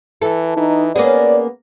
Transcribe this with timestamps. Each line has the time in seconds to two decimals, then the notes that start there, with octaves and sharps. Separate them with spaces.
0.22 E3 A4
0.57 E3 D#4
0.96 A#3 B3 C#4 G#4 D5